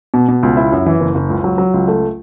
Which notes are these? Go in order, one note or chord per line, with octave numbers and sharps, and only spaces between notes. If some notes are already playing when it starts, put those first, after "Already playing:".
B2
B2
C#2
E4
F#2
E3
F#1
F#1
C#2
F#3
F#3
C#2
A3